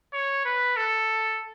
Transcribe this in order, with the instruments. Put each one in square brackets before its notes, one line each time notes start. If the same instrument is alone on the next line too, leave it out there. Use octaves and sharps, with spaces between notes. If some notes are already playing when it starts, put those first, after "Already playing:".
[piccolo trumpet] C#5
B4
A4